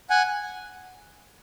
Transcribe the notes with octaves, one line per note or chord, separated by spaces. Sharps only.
F#5 G#5